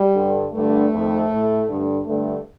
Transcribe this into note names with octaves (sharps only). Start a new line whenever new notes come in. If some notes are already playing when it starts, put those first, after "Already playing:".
Already playing: G3
G2 D3
G2 D3 A3
F2 D#3
A2
G2 D3
G2 D3 A3